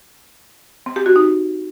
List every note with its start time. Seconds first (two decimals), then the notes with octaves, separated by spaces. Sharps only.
0.86 C4
0.96 G4
1.06 F#4
1.16 D#4